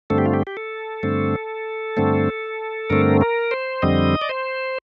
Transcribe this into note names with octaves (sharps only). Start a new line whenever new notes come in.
G2 D3 A3 C4 A4
G4
F4
G4
G4
A4
G2 D3 A3 C4
G2 D3 A3 C4
G2 D3 A3 C4 A#4
A#4
C5
F2 D3 G3 C4 D#5
D5
C5